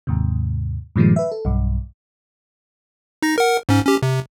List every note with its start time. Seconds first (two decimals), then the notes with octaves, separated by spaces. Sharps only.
0.07 D#2 G#2 C3
0.96 G2 A#2 D#3 F3 G3 G#3
1.16 B4 E5
1.32 A4
1.45 B1 G2
3.22 D#4 A#6
3.38 A#4 F#5
3.69 G#2 C#4
3.85 C#4 G4
4.02 C3